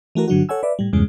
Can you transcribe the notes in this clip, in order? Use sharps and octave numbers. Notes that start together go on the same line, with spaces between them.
E3 A3 F#4 A#4
G2 D3 F#3 D4 F#4
A4 C#5 F#5 G#5 E6
B4 D5 E5
A2 G3
E2 G2 C#3 G#3